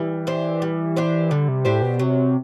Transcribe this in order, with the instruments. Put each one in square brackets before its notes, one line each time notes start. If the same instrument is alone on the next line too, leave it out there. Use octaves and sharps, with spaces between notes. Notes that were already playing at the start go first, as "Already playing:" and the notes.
Already playing: [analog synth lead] E3 [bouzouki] G3
[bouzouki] D4 G4 C5
G3
D4 G4 C5
[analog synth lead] D3 [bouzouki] G3
[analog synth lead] C3
[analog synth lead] A2 [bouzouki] D4 G4 C5
[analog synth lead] B2
[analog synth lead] C3 [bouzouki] F#3